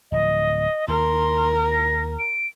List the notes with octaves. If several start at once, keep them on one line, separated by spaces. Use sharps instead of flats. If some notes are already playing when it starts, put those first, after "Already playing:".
D1 F3 D#5
D#2 A#4 C6
A#6
D7